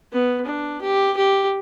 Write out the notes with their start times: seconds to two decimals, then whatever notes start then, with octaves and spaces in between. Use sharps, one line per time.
0.13 B3
0.45 D4
0.82 G4
1.17 G4